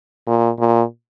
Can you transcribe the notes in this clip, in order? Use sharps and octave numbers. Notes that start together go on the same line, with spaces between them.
A#2
A#2